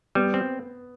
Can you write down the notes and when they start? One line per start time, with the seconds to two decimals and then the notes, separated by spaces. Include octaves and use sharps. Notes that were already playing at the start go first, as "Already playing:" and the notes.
0.15 G3 B3
0.34 C4